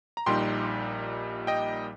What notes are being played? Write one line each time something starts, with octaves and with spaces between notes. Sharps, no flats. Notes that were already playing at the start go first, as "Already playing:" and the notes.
A#5
A#1 A#2 G3 D#4 G5 C6
D#5 G5